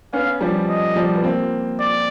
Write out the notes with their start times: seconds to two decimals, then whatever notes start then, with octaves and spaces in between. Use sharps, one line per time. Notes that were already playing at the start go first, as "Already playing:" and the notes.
0.13 B3 C#4 F5
0.41 F3 G3
0.69 D#5
0.96 F3 G3
1.15 B3
1.24 A#3 C4
1.80 D5